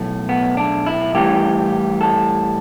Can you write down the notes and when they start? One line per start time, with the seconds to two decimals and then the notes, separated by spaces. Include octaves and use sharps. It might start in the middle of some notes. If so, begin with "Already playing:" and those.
Already playing: B1 A2 A3
0.29 B3
0.57 D4
0.86 E4
1.15 A2 E3 G3 G4
2.01 A4